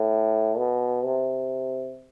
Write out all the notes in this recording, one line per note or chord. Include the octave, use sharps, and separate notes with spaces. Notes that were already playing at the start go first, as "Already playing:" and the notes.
Already playing: A2
B2
C3